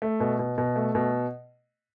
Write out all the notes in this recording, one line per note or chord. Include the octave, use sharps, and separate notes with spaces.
A3
B2
B2
B2
A3
B2